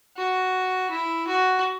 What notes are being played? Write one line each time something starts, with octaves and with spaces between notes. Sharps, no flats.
F#4
E4
F#4